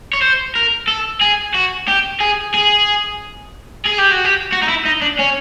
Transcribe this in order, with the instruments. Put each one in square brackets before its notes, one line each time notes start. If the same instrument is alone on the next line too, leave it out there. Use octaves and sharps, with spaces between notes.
[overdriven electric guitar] C#5
C5
A#4
A4
G#4
F#4
G4
G#4
G#4
G#4
G4
F#4
G4
F#4
D#4
E4
D#4
D4
C#4